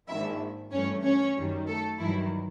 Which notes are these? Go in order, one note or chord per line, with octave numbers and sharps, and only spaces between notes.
A#1 G#2 D#3 E4 E5
G2 E3 A3 C#4 C#5
C#4 C#5
F#2 D#3 G3
A3 A4
G2 D#3 E3 F#3 E4